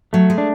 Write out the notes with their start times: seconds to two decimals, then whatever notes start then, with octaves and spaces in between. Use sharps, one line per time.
0.13 F#3 A3
0.30 G#3
0.38 D4